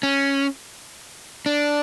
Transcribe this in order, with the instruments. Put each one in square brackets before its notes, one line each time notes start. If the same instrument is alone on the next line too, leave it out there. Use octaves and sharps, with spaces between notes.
[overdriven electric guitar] C#4
D4